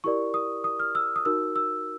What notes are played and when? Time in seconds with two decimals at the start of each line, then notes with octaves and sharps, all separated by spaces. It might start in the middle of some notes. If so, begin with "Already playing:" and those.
0.04 E4 G4 A#4 D5 C#6
0.34 D#6
0.64 D#6
0.80 F6
0.95 E6
1.16 D#6
1.25 D#4 F#4 A#4 E6
1.56 E6